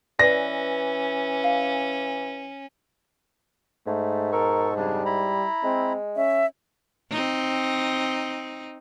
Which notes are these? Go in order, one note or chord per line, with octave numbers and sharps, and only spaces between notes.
E3 C#4 B4 D5 A#6
F5
G#2 A3
B2 A4 A#4 C#6
F2 C#3 G3 D4
E4 A#5 B5
G#3 C4
C#4 E5
C4 D#4